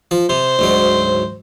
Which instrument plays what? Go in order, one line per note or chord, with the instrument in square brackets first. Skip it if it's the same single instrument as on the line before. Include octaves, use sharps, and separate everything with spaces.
[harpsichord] F3
[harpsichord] C3 [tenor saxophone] C5
[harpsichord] D2 G#2 F#3